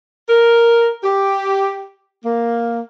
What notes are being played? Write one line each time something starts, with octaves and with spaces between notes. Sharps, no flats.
A#4
G4
A#3